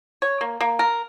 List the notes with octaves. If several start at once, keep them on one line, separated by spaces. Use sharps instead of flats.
C#5
A#3
A#3
A#4